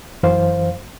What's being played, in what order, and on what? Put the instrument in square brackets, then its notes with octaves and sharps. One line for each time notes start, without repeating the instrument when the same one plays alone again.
[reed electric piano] F#2 E3 C5 F5